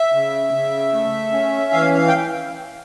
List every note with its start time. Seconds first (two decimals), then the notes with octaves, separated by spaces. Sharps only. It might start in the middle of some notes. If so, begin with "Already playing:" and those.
Already playing: E5
0.13 C#3
0.53 C#3
0.93 A3
1.33 C#4
1.73 E3 F5
1.94 F5
2.07 G5